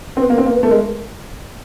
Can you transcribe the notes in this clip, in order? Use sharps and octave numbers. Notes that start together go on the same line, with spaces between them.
C4
B3 B4
A#3
C4
A#3
B4
A3
G#3 A#4